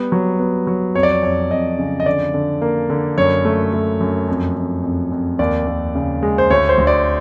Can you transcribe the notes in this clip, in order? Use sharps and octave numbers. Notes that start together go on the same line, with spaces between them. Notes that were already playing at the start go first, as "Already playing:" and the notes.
Already playing: G3 B3
F#3
B3
F#3
F2 C#5
D5
C#5
F2 C#5
F2 D#5
C#3
D#5
D3 D5
D3
A#3
D3
F#2 C#5
A3
A3
F#2
F2
F2
F2
F2
D#2 D5
D#2
C#3
G#3
C5
D2 C#5
C5
D2
D5